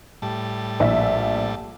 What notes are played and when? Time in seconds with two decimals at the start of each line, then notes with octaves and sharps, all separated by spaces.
0.22 A2 G3 A5
0.80 A#1 E5